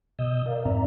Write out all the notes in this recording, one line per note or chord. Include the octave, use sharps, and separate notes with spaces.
B2 D#5 D#6 E6 G6
A#4 D5 F5
F2 G#2 C4 D5 E5 A#5